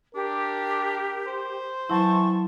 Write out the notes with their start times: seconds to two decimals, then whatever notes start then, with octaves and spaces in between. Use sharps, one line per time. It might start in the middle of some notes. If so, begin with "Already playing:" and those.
0.15 D4 G4 A#4
1.27 C5
1.90 E3 F#3 E4 A5 C6 C#6